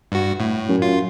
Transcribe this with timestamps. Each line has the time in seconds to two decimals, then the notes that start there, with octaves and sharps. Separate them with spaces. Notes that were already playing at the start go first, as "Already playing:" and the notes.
0.12 G2 F#4
0.40 A2
0.69 F#2
0.82 F4